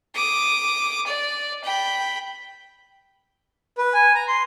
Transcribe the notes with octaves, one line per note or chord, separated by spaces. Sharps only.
D6 D#6
D5
G5 B5
B4
G#5
A#5
C6